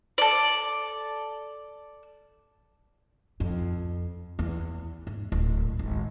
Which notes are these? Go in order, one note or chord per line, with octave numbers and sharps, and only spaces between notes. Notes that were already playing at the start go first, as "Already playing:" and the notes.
A4 D5
F2
E2
G#2
D1
G#1